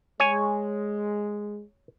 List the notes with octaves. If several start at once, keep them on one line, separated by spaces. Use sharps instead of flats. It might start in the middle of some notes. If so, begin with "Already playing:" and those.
G#3 C#5 G#5